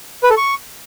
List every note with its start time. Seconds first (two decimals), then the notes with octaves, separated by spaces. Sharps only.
0.23 B4
0.30 A4
0.37 C#6